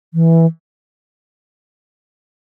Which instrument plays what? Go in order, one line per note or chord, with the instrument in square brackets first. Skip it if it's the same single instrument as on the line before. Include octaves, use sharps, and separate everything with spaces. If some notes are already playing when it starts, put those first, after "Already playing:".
[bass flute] E3